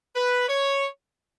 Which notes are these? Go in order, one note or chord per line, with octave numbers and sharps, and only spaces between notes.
B4
C#5